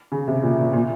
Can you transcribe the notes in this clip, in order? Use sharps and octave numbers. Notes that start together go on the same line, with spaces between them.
C#3
C3
A#2
A#2
A#2